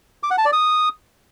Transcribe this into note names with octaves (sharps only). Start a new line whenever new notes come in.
D6
F#5
A5
D5
D#6